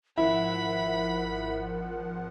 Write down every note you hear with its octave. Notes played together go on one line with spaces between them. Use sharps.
G#1 F3 E4 A#4 F#5 B5